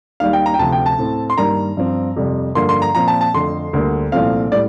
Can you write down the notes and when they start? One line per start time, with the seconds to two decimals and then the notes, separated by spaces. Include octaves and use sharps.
0.20 D#2 D#3 G3 F5
0.33 G5
0.46 A#5
0.54 G5
0.59 D2 C3 F3 A5
0.72 G5
0.86 A5
0.98 A2 A3 C4
1.30 C6
1.38 G2 D#3 G3 A#3 A#5
1.77 G2 F3 C4
2.16 F2 C3 G3
2.55 G2 D3 F3 A#3 C6
2.69 C6
2.82 A#5
2.95 A#2 F3 C4 A#5
3.08 A5
3.21 A5
3.34 F2 D3 A3 C6
3.73 D2 D3 G3 A#3
4.12 C2 A#2 F3 A3 C4 F5
4.52 A2 G3 D5